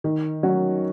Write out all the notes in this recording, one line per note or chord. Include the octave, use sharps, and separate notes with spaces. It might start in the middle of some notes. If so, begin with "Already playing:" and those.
D#3
F#3 C#4 F#4